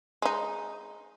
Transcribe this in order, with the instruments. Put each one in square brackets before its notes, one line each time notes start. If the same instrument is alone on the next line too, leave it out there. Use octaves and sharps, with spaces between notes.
[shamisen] G#3 D#4